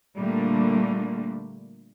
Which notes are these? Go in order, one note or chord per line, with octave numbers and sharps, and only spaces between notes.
A#2 D3 G3 A3 A#3